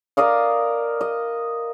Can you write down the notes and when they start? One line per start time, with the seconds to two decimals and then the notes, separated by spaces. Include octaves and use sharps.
0.17 A#4 D5 D#5 F5
1.01 D#5